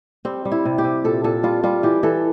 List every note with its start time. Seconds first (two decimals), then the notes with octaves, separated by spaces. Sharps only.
0.25 G3 C4
0.45 G3
0.51 E4
0.65 C3
0.78 G4
0.84 C3
1.04 A#2 A4
1.24 A#2 A4
1.43 G3 F4
1.63 G3 F4
1.83 E3 G4
2.03 E3 A4